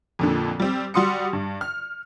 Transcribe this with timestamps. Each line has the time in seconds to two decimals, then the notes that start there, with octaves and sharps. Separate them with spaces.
0.19 F2 A#2 D3
0.60 G3 C4
0.94 G3 F#4 C6 D#6 C#7
1.33 G2
1.61 F6